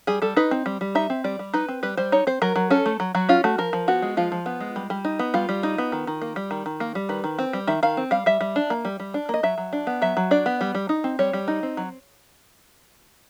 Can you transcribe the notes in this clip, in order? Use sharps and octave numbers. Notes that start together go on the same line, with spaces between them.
G3 G#4
G3 A4
D#4 B4
C4
G3
G3
D#4 E5
C4
G3 D5
G3
D#4 B4
C4
G3 B4
G3 C5
D#4 C#5
C4 C5
F#3 A#4
F#3
C#4 A4
A3
F#3
F#3 F#4
C#4 F4
A3 F#4
F3 A#4
F3
B3 F#4
G#3
F3 F4
F3
B3
G#3
G3
G3
D#4
B3
G3 F4
G3
D#4
B3
D#3
D#3
A#3
G3
D#3
D#3
A#3
G3
D#3 B4
D#3
C4
G3
D#3 E5
D#3 F5
C4
G3 F5
G3 E5
G3
D4
A#3
G3
G3
D4
A#3 D#5
F#3 E5
F#3
D4
B3
F#3 E5
F#3
D4 D5
B3
G3
G3
D#4
C4
G3 C#5
G3
D#4
C4
F#3